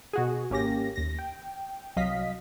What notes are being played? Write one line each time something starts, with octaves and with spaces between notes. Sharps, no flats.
B2 F#4 G#4
G#1 A#3 C#4 G4 A#6
D#2 A#6
G5
C2 F#3 D#5 F5 B6